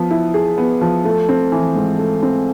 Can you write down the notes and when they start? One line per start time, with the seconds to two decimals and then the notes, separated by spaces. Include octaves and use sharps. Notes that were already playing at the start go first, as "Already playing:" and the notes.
Already playing: F3 B3
0.11 E4
0.34 G#4
0.58 B3
0.81 F3
1.05 A3
1.29 C4
1.52 E3
1.76 G#2
1.99 A3
2.23 C4